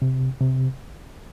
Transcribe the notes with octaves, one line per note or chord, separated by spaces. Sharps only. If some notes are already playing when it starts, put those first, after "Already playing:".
C3
C3